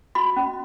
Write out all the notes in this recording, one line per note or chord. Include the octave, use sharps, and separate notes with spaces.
F#4 B5
C#4